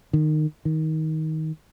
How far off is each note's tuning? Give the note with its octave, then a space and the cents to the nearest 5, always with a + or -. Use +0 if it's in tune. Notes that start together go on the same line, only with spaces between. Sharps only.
D#3 -20
D#3 +20